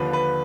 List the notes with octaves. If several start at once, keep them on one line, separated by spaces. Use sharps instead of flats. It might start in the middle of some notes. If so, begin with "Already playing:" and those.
Already playing: D#2 D3 F3 B4
B4